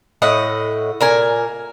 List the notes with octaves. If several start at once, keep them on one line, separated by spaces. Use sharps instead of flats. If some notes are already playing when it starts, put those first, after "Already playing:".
A2 D#5 F#5
A#2 A#4 G#5